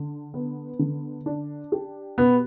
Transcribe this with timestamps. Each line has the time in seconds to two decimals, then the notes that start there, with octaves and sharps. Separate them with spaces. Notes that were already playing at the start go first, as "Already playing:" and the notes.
Already playing: D3
0.34 B3
0.79 D3
1.26 D4
1.72 G4
2.18 B2 B3